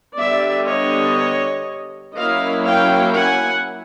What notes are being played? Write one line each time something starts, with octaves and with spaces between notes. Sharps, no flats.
D3 G3 B3 D5 E5
C#5 D#5
F#3 A#3 C#4 E4 D#5 F5
F5 G5
F#5 G#5